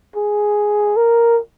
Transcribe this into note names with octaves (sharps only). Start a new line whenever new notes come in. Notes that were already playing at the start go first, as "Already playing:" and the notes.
G#4
A#4